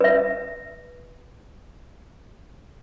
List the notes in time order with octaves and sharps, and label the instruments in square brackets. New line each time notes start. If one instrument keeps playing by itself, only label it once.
[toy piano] B4 E5